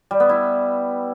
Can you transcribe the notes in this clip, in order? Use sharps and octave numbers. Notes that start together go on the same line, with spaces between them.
G3
B3
E4